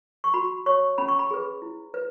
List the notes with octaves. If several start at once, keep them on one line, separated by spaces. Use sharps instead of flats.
C#6
F#4 B5
C#5 C#6
C#4 B5
C#6
B5
G#4 B4
E4
B4